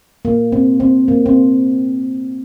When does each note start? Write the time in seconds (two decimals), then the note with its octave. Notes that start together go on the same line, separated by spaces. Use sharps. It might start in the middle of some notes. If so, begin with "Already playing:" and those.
0.25 A#3
0.52 C4
0.80 C4
1.08 A#3
1.26 C4